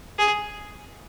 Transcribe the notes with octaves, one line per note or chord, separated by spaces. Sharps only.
G#4